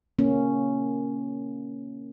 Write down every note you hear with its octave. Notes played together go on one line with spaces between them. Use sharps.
A#3 C#4